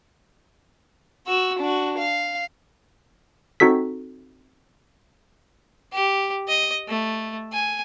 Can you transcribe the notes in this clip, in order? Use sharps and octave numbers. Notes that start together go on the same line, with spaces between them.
F#4 E6
D4 F#4
F5
C4 D#4 F#4 A4 B6
G4
D#5
A3
G#5